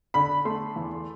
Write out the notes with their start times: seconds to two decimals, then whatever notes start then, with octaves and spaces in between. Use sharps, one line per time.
0.14 D3 B5
0.45 A3 C6
0.76 E2